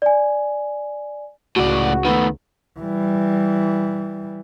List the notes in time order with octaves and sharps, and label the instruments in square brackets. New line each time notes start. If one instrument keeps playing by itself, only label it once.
[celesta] D5 G#5
[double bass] C#2 [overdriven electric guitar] A2 D5 [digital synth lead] F#4
[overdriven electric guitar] D#3 A3 [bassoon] B3
[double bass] E3 G3